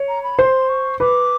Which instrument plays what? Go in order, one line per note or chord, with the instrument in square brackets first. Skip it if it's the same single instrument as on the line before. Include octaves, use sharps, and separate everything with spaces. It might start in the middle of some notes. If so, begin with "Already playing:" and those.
Already playing: [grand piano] C#5
[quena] A#5
B5
[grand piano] C5 [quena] C6
[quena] C#6
[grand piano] B4 [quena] D6